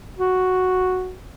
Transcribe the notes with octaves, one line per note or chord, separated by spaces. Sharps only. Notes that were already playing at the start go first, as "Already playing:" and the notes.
F#4